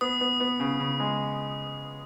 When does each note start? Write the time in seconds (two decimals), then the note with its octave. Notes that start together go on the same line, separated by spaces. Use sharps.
0.01 B3 D#6
0.21 B3
0.40 B3
0.60 C#3
0.80 C#3
1.00 G#3